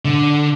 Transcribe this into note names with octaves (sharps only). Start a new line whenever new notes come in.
D3